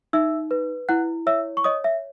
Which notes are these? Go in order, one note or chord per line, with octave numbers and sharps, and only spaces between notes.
D#4 E5 E6
B4
E4 F#5 F#6
C#5 E5 E6
C#6
C#5 D#5 D#6
E5